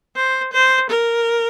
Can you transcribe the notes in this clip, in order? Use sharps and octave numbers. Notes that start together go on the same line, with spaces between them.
C5
C5
A#4